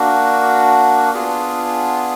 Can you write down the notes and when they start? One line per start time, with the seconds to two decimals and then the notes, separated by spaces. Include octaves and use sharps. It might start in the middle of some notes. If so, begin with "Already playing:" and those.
Already playing: A#3 D4 F#4
1.13 B3 D4 F4 G#4